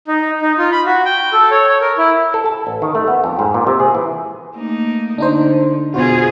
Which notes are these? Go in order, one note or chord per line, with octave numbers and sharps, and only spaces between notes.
D#4
D#4
F4
B5
F#4
G5
A4
C#5
C#5
A#4
E4
A4
A5
A1
D#3
A3
B3
F2
G#2
A#2
C3
G#4
E3
A3 A#3 D#4
D3 D4 D#4 C5
B2 F4 F#4 G#4 C5